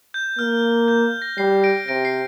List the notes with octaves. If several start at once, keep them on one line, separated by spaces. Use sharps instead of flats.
G6
A#3 F6
G6
A#6
G3 C7
A#6 D7
C3 A#6 D7
C7